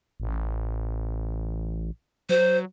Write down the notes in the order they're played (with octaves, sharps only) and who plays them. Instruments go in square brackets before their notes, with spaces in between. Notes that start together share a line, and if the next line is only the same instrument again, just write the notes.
[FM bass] A1
[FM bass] F#3 [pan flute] C5